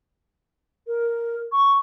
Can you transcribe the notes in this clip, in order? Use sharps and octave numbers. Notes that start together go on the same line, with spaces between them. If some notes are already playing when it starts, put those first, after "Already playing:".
A#4
C#6